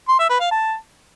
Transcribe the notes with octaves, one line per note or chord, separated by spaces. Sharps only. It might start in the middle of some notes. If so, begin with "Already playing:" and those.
C6
E5
B4
F5
A5